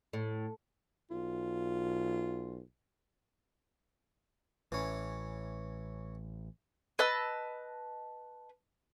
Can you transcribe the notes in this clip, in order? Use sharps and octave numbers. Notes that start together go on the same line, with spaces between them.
A2
B1 F4
A1 E3 C#4
B4 D#5 A5 E6